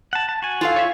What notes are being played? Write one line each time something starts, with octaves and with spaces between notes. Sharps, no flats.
F#5 A5
A5
F#4 G#5
F4 A4 F5
C#5 E5 C#6